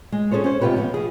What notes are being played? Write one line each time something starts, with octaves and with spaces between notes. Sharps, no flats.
G#3
C#4 G#4 A4 C5 C#5
C#4 C5
G#2 C3 F4 G4 B4 C#5
F3 B3
F3 G#4